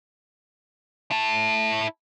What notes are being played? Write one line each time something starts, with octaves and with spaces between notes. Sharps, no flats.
E4 A4